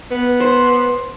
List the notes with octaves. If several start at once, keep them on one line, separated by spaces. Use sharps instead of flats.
B3
C5